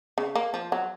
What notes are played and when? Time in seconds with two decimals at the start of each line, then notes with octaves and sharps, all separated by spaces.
0.18 C#3
0.35 A#3
0.54 F3
0.72 F#3